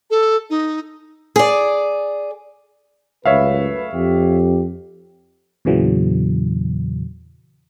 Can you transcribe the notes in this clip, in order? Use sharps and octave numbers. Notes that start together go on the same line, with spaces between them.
A4
D#4
G#4 D5
C#2 F#2 A3 B4 C#5 E5 F5
F2 G4
E2 A#2 C#3 E3 F#3